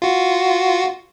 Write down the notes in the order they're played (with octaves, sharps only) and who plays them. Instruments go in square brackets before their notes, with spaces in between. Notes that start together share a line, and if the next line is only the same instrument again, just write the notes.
[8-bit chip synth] F4 F#4